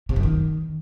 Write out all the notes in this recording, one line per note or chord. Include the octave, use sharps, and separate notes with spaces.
C3
F#2
D#3